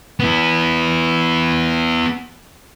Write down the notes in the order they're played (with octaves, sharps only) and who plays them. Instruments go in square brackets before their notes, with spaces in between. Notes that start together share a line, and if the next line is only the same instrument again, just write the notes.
[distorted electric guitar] B3 E4